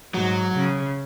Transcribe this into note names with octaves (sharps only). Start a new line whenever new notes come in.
G#2 F#3
C#3